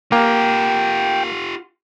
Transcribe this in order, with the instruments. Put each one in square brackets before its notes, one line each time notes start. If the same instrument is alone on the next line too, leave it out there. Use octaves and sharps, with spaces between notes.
[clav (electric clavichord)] A#3 [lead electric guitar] F4 G4 [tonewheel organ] G5